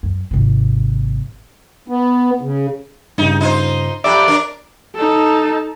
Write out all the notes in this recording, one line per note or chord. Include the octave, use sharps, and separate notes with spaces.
F#2
G#1 C3
B3
C#3
G2 C#3 D#4
D#4 F4 C5
F2 G4 D5 E5 A#5 F#6
D4 A#4
D#4 A4